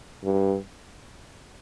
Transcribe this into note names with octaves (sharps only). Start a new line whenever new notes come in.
G2